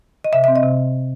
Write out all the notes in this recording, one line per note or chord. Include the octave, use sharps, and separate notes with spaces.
D#5
C3 E5
C4 E5
D#5
C3